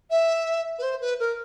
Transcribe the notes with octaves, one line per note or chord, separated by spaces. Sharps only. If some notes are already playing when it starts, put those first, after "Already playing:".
E5
B4
C5
B4
A#4